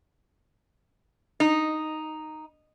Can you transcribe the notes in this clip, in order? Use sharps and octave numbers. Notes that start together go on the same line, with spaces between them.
D#4